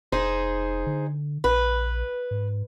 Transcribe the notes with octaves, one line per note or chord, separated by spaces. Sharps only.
F1 D#4 G#4 C5
D3
A#1 B4
G#2